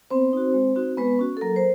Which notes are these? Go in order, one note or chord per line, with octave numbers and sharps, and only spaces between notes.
B3 C4 C5
D#4 F#4
G#3
C4 D#4 F#4
G#3 B3 B4
C#4 F#4
A4
F#3 A#3 A#4
C5